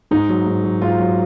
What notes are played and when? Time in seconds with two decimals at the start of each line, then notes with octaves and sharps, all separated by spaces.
0.11 G#2 D#4
0.29 F#3
0.47 G#2
0.64 F#3
0.81 G#2 F4
0.99 F#3